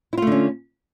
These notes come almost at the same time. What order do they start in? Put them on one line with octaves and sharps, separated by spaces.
E4 F4 A3 D3 C#4